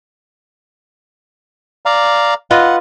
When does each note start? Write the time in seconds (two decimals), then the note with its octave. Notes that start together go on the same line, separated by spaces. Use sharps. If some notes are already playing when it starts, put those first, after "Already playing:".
1.86 D5 F5 A#5
2.51 F4 B4 D#5 F#5